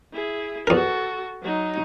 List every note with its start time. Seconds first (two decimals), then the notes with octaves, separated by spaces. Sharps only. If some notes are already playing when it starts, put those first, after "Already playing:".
0.13 E4 G#4
0.67 E2 F#4 A4 A#4
1.42 F#3 D#4